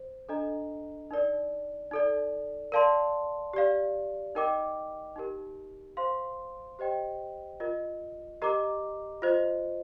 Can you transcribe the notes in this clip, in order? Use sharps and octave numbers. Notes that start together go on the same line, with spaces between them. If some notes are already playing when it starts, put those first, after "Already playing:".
Already playing: C5
D4 A4 D#5 A#5
D#4 A#4 D5
D#4 A4 D5
A#4 D5 F5 A5 C6
G4 D5 F5
D#4 A#4 D#5 G5 D6
D#4 G4 A#4
C5 F5 C6
G4 C5 D#5 G5
F4 A#4 D#5
G4 A#4 D#5 A#5 D6
F4 C5 D#5